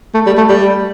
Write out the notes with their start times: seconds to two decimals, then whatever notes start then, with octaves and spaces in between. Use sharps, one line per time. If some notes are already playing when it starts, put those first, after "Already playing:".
0.14 A3
0.26 G3
0.37 A3
0.49 G3